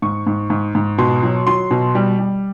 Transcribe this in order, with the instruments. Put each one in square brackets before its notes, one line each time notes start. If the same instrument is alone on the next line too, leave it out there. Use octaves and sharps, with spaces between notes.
[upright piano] G#2 C#6
G#2
G#2
G#2
B2 C6
F#3
F#3 C6
B2
G3
G3